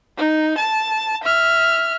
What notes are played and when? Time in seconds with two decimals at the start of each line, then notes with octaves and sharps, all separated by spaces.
0.17 D#4
0.58 A5
1.23 E5 F6